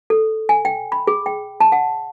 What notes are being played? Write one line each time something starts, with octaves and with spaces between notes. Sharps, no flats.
A4
G#5
G5
B5
G#4
G5
A5
F#5